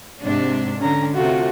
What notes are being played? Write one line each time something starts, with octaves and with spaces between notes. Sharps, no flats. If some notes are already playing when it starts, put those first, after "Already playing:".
G#2 C3 D4
D3 C#4 A#5
C3 A3 F4 F#4